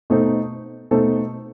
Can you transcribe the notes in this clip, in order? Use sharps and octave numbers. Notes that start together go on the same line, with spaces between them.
B2 A3 D#4 A4 C5
B2 A3 D#4 A4 C5